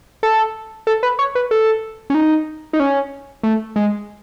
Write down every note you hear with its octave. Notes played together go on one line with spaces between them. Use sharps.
A4
A4
B4
C#5
B4
A4
C#4
D#4
D#4
C#4
A3
G#3